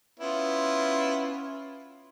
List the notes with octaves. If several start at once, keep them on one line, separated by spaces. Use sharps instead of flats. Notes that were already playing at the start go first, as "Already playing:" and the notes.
B3 C#4 E4 F4